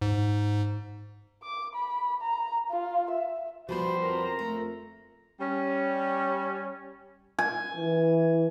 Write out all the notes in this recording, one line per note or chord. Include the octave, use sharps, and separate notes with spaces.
G#2
D6
B5
A#5
F4
E5
F3 G3 B3 F#4 G4 C5 B5
F2 A#4 A#5
A3
G3 C#4
G#5
E3